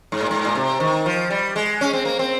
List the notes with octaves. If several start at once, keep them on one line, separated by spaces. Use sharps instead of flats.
G#2
A#2
G#2
A#2
C3
D#3
F3
G3
G#3
C#4
C4
A#3
C4